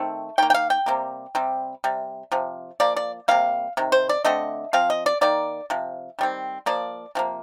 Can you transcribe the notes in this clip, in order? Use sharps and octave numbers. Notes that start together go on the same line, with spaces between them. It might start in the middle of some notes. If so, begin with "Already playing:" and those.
Already playing: D#3 A3 C4
D#3 A#3 G5
G5
F5
G5
C3 G3 A#3
C3 G3 C4
C3 G3
C3 F3
F3 A#3 D5
D5
C3 G3 A#3 F5
C3 D#3
C5
D5
D3 A3 C4 D#5
F3 C4 F5
D#5
D5
D#3 A#3 D5
C3 F3
D#3 G3 C4
F3 A#3 D5
C3 F3 A#3